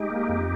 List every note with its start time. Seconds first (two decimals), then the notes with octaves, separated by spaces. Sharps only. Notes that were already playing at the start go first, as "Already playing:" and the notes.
Already playing: G#3 D#4 G4
0.10 A#3
0.29 F2